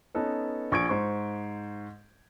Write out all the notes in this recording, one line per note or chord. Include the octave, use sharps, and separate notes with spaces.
B3 C#4 D#4 A4 B4
A#1 C#6 G#6 D7
G#2 C5 C#6